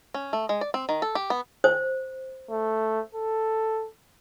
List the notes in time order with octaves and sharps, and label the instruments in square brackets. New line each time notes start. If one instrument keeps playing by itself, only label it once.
[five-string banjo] C#4
A3
G#3
D5
C4
D#3
A4
G4
B3
[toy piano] C5
[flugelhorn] A3
A4